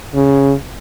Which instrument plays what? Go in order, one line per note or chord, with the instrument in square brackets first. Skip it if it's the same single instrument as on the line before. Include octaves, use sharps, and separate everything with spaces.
[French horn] C#3